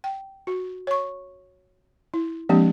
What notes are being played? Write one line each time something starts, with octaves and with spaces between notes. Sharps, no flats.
G5
F#4
C#5 C#6
E4
F3 G#3 A#3 C4 D4 G4